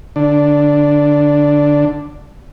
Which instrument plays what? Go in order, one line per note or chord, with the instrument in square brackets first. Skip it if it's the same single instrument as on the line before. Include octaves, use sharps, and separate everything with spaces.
[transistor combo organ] D3 D4